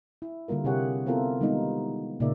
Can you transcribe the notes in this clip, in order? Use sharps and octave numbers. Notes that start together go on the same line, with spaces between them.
E4
D3 G3 A#3 F4 A#4
C3 E4 G4 G#4 C#5 F#5
B3 C4 E4 F4 A4 A#4
D#3 G3 G#3 B3 D#4 F4
A#2 C#3 A#3 D#4 D5 E5